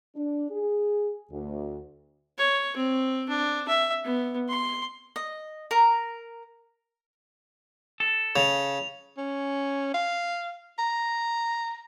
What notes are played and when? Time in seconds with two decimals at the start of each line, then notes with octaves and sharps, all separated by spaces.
0.16 D4
0.51 G#4
1.31 D2
2.38 C#5
2.76 C4
3.29 D4
3.68 E5
4.04 B3
4.49 C6
5.16 D#5
5.71 A#4 A#5
8.00 A4
8.36 C#3 F7
9.17 C#4
9.94 F5
10.79 A#5